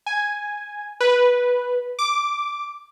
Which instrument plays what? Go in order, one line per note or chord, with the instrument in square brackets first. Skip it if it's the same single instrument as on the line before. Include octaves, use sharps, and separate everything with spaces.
[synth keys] G#5
B4
D6